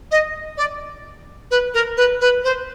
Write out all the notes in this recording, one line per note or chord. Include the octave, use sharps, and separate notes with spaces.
D#5
D5
B4
A#4
B4
B4
C5